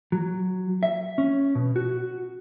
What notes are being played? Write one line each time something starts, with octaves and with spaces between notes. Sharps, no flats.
F#3
E5
C#4
B2
F#4